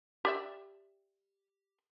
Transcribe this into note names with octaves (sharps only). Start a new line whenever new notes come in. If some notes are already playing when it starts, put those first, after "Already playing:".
G4 D5 E5